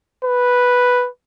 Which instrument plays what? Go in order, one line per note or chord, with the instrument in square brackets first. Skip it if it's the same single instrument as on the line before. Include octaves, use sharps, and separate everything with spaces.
[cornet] B4